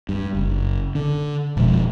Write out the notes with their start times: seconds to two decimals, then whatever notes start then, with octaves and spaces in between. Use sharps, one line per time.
0.09 G2
0.34 F#1
0.95 D3
1.57 F1 B2 F3 G#3